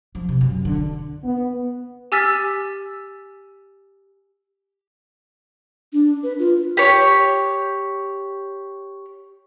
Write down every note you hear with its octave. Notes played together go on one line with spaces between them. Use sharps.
F3
C3
F#2
D3
B3
G4 G#5 E6 F6 A6 B6
D4
B4
F4
G4 C#5